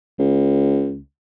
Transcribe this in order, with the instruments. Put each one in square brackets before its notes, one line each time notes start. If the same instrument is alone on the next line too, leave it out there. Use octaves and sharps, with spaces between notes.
[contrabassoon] C#2